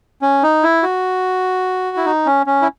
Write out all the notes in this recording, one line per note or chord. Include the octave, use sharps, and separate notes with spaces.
C#4
D#4
E4
F#4
E4
D#4
C#4
C#4
E4